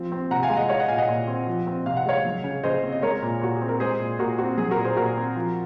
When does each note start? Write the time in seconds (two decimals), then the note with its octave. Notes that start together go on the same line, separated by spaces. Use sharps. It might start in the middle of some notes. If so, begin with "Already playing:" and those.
Already playing: F3 C4
0.12 C4
0.31 C3 F#5 A#5
0.43 F5 G#5
0.50 G#3
0.57 D#5 F#5
0.69 G#3 C#5 F5
0.79 D#5 F#5
0.88 A#2 F5 G#5
0.98 D#5 F#5
1.08 A#2
1.27 C4
1.47 F3
1.67 C4
1.86 C3 F5
1.97 F#5
2.06 G#3 C#5 F5
2.25 F#3
2.44 C#3
2.63 C#3 C5 D#5
2.83 C4
2.92 D#5
3.02 G#3 A#4 C#5
3.22 A#2
3.41 A#2 F#4
3.56 G#4
3.61 C4
3.69 A#4
3.80 G#3 G#4 C5
4.00 A#2
4.19 A#2 F#4 A#4
4.38 C4 F#4
4.58 F#3 G#4
4.71 F#4 A#4
4.78 A#2
4.84 G#4 C5
4.96 A#2 F#4 A#4
5.17 C4
5.35 F3